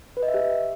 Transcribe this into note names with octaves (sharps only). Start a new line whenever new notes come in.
B4
D#5
E5
G4